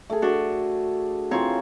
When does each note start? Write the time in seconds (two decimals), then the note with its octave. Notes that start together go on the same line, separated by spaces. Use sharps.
0.10 A3 G#4
0.22 D4 F#4
1.31 E3 C4 F4 C#5 A#5